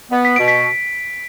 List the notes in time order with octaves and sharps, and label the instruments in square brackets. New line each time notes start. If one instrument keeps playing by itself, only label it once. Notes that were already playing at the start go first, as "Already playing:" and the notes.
[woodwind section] B3
[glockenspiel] B6
[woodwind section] B2 [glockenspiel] D7
[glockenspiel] B6